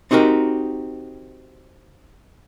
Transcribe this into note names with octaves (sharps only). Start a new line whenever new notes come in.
C4 D#4 F#4 G4 A#4